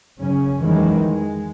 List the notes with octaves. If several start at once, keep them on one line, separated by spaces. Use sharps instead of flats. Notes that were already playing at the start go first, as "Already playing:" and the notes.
F#2 C#3 C#4
F2 D#3 E3 F#3 G#3
G#3